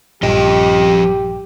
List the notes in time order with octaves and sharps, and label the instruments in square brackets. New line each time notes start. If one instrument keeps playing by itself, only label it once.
[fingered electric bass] A#1 G2 [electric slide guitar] F3 D#5 [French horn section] G4